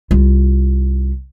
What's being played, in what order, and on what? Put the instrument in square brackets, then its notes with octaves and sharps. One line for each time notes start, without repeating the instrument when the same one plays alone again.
[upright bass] C2 F4